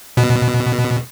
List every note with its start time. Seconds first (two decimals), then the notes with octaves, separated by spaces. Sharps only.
0.17 B2